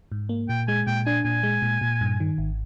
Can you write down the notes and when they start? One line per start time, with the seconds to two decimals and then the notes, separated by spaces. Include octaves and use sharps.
0.12 G#2
0.29 A#3
0.49 A#2 G5
0.68 G#3 G#5
0.87 A#2 G5
1.06 D4 G#5
1.25 A#2 G#5
1.43 G#3
1.62 A#2
1.81 A#2
2.01 G2
2.20 D#3
2.38 G#1